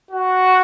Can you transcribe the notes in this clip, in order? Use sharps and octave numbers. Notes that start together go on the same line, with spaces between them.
F#4